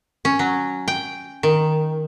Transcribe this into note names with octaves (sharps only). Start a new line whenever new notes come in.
C#4
F#3
G5
D#3